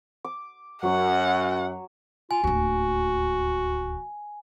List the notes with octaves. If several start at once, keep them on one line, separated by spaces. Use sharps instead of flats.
D6
F#2 F#3 C#5 F#5
F4 G#5
D1 D#2 F#4